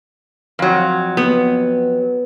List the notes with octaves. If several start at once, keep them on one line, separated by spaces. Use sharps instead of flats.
F2 F#3
B3